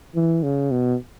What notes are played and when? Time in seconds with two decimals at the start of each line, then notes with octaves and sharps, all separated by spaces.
0.16 E3
0.43 C#3
0.71 B2